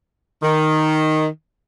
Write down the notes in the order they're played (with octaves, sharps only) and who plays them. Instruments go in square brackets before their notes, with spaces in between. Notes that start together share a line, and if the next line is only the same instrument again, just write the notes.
[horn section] D#3